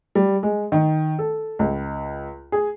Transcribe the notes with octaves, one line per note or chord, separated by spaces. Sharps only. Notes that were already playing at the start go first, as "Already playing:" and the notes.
G3
G#3
D#3
A4
C#2
G#4